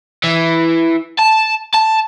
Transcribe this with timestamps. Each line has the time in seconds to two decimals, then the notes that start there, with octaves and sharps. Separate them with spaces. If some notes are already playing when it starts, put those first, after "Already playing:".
0.24 E3
1.19 A5
1.74 A5